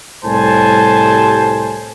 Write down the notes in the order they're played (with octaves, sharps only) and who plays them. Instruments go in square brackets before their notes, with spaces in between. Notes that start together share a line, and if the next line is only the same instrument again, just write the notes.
[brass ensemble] C2 A2 G3 C5 G#5 A5